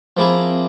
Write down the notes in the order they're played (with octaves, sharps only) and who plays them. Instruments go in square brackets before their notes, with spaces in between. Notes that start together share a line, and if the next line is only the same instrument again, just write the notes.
[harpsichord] F3 A#3 E4 G#4 [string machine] C4